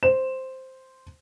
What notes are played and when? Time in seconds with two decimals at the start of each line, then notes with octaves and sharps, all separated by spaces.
0.03 C5 E7